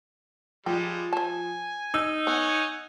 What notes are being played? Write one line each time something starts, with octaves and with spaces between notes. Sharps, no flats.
F3 G3 G#3 G5
C5 G#5 A5
D#4 E6
B3 C#5 F#5 G#5